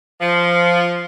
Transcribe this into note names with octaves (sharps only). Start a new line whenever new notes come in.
F3